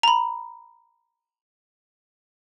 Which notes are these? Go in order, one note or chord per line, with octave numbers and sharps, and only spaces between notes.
A#5 B5